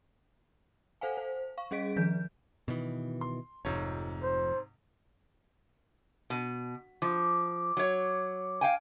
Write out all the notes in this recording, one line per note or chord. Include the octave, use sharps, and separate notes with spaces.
A4 C5 F5 F#5 G#5
C5
F5 C#6
G3 C#4 G#4 D#5 B6 D7
D#3 F3 G6
B2 D#3 E3
C6
F1 F2 G#2 C3 C#5
C5
B2
F3 D6
F#3 C#5
F5 G5 G#5